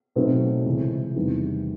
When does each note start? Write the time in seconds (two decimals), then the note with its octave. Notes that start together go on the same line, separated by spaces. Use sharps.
0.16 B2 F#3 A3 C4 D#4
0.66 C#2 C3 E3
1.15 E2 C3 D#3 G3